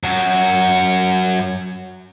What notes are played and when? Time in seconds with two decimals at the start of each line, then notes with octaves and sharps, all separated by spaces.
0.03 F#2 F#4